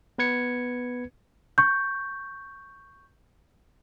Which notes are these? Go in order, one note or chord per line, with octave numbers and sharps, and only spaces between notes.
B3 B4 G#6 C#7
C#6 G6